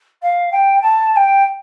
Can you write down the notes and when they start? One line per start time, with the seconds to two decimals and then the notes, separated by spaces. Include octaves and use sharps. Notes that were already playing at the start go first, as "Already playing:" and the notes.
0.22 F5
0.52 G5
0.82 A5
1.12 A5
1.16 G5